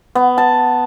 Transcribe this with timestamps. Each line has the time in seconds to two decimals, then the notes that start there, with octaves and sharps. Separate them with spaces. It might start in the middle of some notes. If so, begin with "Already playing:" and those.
0.15 B3
0.38 A5